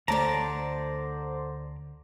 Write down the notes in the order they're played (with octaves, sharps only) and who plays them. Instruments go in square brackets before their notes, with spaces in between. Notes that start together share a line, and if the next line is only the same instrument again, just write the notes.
[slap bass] D2 A3 [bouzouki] D3 A5 [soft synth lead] C5 [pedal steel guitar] D5 A#5